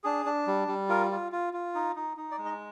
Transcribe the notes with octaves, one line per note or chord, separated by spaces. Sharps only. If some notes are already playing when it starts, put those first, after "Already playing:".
D4 G#4
D4
G3
G3
F4 A#4
F4
F4
F4
D#4
D#4
D#4
D5
G#3
D#5